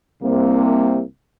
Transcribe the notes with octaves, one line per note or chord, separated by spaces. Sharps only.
C2 C3 A#3